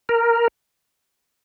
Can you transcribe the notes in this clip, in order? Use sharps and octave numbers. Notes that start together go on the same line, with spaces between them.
A#4